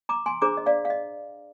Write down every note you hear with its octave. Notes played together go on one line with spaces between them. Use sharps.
A#5 D6
G#5 C6
D4 G#4 C5 A#5 D6
D#5
D5 F5
F5
D#5